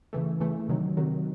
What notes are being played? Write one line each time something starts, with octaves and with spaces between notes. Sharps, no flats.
C#3 E3 A3
C#3 E3 A3
C3 D#3 F#3
C3 D#3 F#3